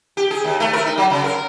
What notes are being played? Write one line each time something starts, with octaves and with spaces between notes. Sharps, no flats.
G4
G#4
D#2
A3
A#4
D#4
F#3
C#3
A#4